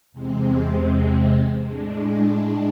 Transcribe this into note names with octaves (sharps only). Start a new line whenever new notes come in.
E2 C3 G#3 C4
A2 G#3 D4